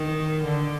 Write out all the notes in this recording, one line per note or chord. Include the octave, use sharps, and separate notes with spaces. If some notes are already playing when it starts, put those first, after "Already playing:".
Already playing: D#3
D3